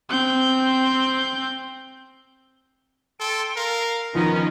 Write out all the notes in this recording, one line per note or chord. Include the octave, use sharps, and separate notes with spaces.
C4 G6
A4 G5 C6
A#4 F5
D#3 F3 B3 C#4 D#4